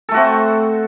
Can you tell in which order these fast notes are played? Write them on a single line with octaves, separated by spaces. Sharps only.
A4 A3 F#4 C4